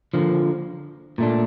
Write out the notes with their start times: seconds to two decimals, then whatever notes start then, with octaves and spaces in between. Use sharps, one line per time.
0.14 D3 F3 A#3
1.18 A#2 A3 D4